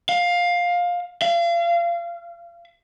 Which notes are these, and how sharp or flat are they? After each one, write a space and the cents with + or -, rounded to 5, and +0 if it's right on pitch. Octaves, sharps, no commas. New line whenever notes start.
F5 +15
F5 -35